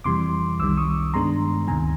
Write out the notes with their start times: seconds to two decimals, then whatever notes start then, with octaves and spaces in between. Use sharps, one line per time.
0.04 F2 C3 E3 G3 C6 D6
0.59 C2 C3 D#3 G3 D6 E6
0.77 C#6 D#6
1.14 G2 D#3 G#3 B3 D4 A#5 C6
1.68 D2 C3 D#3 G#5 A#5